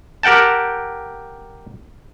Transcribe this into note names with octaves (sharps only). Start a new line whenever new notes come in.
G4 A#4 F#5 G5 A5